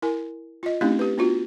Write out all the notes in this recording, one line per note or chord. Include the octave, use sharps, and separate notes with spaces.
E4 A#4 G#5
F4 D#5
A3 C4 C#4 D#4 E4 G4
G4 B4
B3 D4 F4 F#4